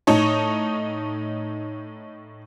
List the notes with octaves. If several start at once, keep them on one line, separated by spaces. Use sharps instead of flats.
A2 D#4 C#5 A5